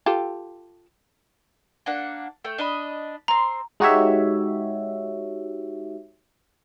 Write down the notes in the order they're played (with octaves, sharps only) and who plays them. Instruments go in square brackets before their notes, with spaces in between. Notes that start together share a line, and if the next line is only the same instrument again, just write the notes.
[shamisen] F4 G4 A4
[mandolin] A#3 D4 F#5
A3 G5
D4 D#5 B5
[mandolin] C4 C6 [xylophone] A#5
[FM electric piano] G#3 D#4 F#4 G4 C#5 E5